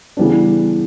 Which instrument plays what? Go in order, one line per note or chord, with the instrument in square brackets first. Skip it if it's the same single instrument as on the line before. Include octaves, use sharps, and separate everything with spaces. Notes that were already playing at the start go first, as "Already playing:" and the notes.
[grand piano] C#3 E3 G3 B3 D4